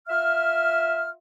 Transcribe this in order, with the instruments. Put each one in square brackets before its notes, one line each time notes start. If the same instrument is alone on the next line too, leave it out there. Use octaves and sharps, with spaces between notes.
[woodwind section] F4 E5 F6